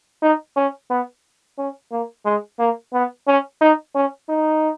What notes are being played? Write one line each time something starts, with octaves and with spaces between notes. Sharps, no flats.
D#4
C#4
B3
C#4
A#3
G#3
A#3
B3
C#4
D#4
C#4
D#4